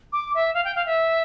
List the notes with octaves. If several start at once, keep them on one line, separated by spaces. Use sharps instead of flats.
D6
E5
F5
G5
F5
E5